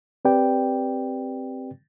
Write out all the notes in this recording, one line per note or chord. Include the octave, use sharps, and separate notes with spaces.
C4 G4 B4 D5 G5